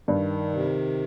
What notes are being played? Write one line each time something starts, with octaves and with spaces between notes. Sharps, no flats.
G2 D#3
C3